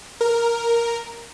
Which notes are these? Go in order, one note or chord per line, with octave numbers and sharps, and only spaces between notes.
A#4